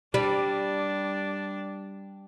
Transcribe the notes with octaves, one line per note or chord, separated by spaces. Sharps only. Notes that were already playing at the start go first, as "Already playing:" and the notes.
G3 D4